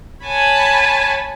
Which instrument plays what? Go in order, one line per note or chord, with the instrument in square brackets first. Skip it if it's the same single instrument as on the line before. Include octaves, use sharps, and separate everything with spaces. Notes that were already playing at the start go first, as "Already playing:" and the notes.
[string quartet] C#5 F#5 G#5 A5 B5